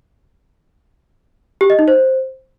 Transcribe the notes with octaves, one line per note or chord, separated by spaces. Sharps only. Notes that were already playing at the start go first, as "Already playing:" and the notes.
G4
D#5
D#4
C5